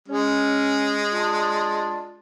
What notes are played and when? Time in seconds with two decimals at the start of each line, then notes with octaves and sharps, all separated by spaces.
0.08 G#3 C#4
1.12 D4 F4